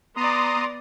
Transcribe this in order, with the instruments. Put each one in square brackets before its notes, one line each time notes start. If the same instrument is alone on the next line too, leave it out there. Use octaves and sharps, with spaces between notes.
[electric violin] B3 D5 [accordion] A#5 C6 D#6